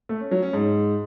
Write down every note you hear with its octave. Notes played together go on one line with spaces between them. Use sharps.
A3
C#4
F#3
C#4
G#2